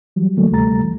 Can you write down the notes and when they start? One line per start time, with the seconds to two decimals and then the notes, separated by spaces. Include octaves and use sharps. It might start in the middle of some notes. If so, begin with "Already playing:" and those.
0.16 E3 F#3 G3
0.37 D3 F#3 A3 A#3
0.51 D2 C3 G3 A3 A#5 A6
0.83 E3